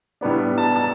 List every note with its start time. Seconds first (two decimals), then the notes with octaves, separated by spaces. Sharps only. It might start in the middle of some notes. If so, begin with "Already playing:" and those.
0.21 A2 G3 B3 D4
0.58 A5
0.76 A5